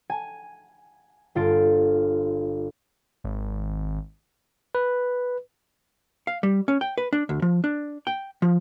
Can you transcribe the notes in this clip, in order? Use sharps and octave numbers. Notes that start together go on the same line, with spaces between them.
G#5
G1 F4 A6 D7
G#1
B4
F5
G3
C#4
G5
B4
D4
D2
F3
D4
G5
F3